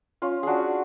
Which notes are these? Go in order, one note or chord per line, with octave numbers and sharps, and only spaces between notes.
C#4 F4
D4 F#4 G#4